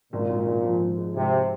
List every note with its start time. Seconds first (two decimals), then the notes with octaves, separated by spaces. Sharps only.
0.12 G#1 A#2
0.29 G#1
0.46 G#1
0.64 F3
0.81 G#1
0.98 G#3
1.15 G#1 C3